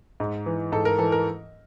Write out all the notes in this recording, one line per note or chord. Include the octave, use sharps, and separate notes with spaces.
G#2
E3
G#2 A4
A#4
E3 A4
A#4